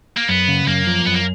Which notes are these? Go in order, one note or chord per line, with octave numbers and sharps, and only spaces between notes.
A#3
F#2 B3
C#3
F#2 A#3
F3
F#2 B3
A#3